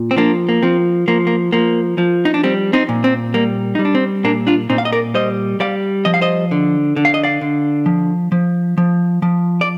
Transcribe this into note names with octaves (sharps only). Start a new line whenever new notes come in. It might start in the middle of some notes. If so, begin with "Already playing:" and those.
Already playing: A#2
C4
F3 A#3 D4
A#3
F3 C4
F3 A#3
A#3
F3 A#3
F3
D#4
D4
G3 C4
C4 D#4
A#2
C4
G3 A#3
G3 D#4
D4
C4
A#2 A#3 D4
D4 F4
A#2 C4 D#4
F5
D#5
A#4 D5
G3 C5 D#5
G3 D5 F5
F3 D#5
F5
C5 D#5
D3
D3
F5
D#5
D5 F5
D3
F3
F3
F3
F3
D5